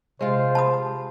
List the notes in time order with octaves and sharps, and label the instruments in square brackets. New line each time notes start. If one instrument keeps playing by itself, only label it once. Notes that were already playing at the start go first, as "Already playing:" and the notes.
[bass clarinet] C3 [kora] G#3 F4 [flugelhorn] C5
[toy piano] A5 B5 D#6